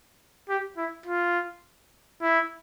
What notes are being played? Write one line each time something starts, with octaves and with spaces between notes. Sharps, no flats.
G4
E4
F4
E4